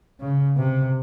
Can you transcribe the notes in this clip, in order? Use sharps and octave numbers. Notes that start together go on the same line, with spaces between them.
C#3
C3